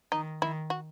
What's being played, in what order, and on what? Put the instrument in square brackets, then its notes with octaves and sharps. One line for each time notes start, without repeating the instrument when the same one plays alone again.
[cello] D#3 [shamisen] D#4
[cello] D#3 [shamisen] E4
[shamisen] F#4